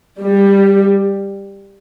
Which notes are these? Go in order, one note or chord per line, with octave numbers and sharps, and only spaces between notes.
G3